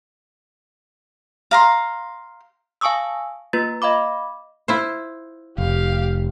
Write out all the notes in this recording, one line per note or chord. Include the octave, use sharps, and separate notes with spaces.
F5 A#5 C6
F5 G#5 A5 C#6 D#6 E6
A#3 F4 B4 A6
D#5 F5 B5 D6
E4 F4 C5
F1 G4 F5